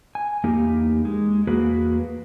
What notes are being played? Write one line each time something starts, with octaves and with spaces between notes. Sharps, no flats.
G#5
E2 A#3 D#4 G4
G#3
E2 A#3 F#4 G#4 B4